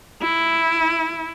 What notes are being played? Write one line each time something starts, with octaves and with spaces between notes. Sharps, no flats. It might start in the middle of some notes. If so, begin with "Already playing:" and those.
E4